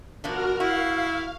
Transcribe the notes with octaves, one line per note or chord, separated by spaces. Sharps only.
B2 F3 D4 F#4 A#4 F6
E4 F#4 F5